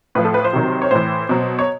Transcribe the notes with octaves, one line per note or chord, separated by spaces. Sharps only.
A2 F3 B4
A4
B4
C5
C3 D#3 F#3
C#5
A2 E3 C5
B2 F#3
C#5